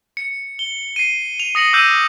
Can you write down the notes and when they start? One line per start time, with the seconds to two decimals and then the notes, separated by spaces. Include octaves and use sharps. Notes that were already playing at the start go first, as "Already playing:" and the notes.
0.17 C#7
0.59 G7
0.96 C7 D#7
1.40 F7
1.55 D#6 A#6 C#7 F#7
1.73 D6 E6 F#6 G6 D#7